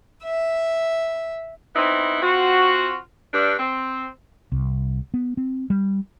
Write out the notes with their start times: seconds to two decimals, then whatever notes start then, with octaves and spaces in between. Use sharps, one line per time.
0.25 E5
1.75 B3 C4 D#4 E4
2.22 C4 F4 F#4
3.33 G2 D4
3.59 C4
4.52 C2
5.14 B3
5.37 C4
5.70 G3